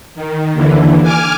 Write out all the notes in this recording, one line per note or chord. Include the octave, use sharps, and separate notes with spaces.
D#3
D#2 D3 E3
G#5 D6 F6